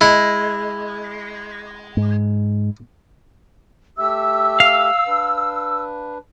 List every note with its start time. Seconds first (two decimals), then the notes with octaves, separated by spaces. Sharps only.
0.01 G#3 E4
1.97 G#2
3.99 A3 G4 E5 E6
4.60 F5
5.07 D4 B4